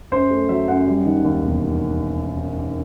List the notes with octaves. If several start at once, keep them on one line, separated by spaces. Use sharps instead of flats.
F#2 C5
A3
F#3 E5
F#2 F#5
G3
D#3
D#2
E1